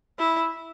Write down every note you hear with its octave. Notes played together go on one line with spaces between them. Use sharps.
E4